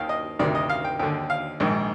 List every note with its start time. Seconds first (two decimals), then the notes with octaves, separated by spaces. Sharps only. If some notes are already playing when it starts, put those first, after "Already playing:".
Already playing: D#2 D#3 F5
0.09 D#5
0.39 D2 C3 D#3 D5
0.55 D#5
0.70 F5
0.84 G5
0.99 D#2 D3 G5
1.30 F5
1.60 A#1 G#2 D#3